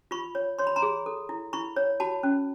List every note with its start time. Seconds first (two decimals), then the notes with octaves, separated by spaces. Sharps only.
0.11 F4 B5 C#6
0.35 C#5
0.59 C#5 C6
0.67 B5
0.76 A#5 C6
0.82 G#4
1.06 A4
1.29 E4
1.53 E4 B5 C#6
1.76 C#5
2.00 F#4 A5 B5
2.23 C#4